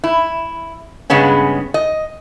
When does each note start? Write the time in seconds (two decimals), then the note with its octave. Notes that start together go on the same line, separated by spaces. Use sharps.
0.04 E4
1.10 G2 C#3 G#3 B3 C#4
1.74 D#5